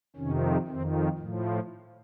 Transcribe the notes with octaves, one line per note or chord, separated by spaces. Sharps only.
F2 C3 D#3 C#4
F2 D#3 C4
A2 F3